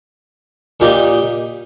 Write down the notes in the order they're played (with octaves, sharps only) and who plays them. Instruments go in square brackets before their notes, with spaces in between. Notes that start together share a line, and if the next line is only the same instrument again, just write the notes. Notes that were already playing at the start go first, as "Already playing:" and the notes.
[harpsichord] A#2 G3 A#3 D#4 G4